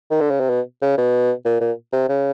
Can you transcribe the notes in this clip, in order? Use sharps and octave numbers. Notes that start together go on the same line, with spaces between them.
D#3
D3
C#3
C3
B2
C#3
B2
A#2
A#2
C3
C#3